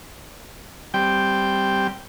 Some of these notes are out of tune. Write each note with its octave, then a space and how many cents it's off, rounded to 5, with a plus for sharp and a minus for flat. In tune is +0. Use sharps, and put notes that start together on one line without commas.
G3 +0 C4 +0 G5 +0